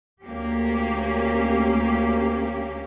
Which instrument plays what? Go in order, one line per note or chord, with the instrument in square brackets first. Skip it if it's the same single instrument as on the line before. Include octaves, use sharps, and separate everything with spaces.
[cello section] D2 A#3 C#4 G4